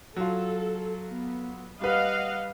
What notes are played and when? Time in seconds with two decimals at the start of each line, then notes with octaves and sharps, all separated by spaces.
0.16 F#3 F4 A4
1.10 B3
1.81 G3 B4 D#5 F5 F#5